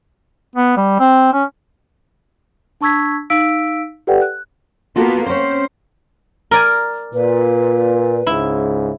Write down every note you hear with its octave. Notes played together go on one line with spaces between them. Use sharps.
B3
G3
C4
C#4
D4 A5 C#6 E6 G#6 B6
D#4 F5 E6 B6 D7
G4 A4 B4 D5 F#5 G5
F#6
A#3 B3 F4 F#4 A4
C4 C#4 C5
A#4 D5 G#5
A#2 B4
C#2 G#2 C#3 E4